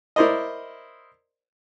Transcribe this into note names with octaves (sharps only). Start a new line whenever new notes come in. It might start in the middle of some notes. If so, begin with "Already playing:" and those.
E4 A#4 C5 D5 D#5